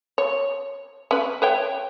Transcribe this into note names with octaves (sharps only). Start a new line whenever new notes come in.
C#5
C#4 B4
B4 C#5 G5